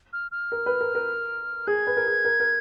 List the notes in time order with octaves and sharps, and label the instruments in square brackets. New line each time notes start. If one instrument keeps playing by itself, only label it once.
[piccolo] F6
F6
[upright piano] A#4
B4
A#4
A#4
[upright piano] G#4 [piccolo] G#6
[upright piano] B4
A#4
G#4
A#4
A#4